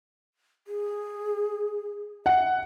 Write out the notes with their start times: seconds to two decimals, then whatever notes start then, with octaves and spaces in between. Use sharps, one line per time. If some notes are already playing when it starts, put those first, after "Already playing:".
0.67 G#4
2.26 E5 F#5